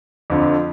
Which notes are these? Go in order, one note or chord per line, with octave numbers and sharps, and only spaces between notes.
F2 D3 F3